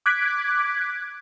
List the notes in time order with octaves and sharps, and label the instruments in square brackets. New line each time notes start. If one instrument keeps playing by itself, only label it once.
[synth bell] D6 F#6 G#6 B6 D7